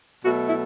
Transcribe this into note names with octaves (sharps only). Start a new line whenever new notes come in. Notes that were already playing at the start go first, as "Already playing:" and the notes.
B2 F#3 A3 F#4
E4